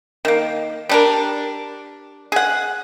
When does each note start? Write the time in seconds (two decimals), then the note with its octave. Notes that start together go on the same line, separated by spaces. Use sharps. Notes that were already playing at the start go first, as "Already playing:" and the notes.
0.25 D#3 A#3
0.89 G3 D4 A#4
2.32 G#4 F#5